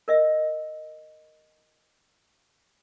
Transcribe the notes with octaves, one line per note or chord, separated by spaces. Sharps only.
A#4 D#5 E5